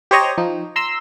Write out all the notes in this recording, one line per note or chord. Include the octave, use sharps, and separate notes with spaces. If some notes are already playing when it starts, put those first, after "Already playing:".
G4 C5 C#5 D#5 A#5
F3 D#4
A#5 C6 E6